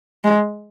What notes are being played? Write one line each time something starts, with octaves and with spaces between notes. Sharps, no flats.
G#3